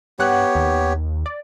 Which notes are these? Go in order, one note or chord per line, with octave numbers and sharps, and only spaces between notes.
G2 B3 G4 C#5 F#5 F#6
D#2
D5